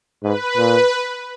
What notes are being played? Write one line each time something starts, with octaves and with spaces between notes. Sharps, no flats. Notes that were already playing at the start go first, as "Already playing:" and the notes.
G#2 B4
A#2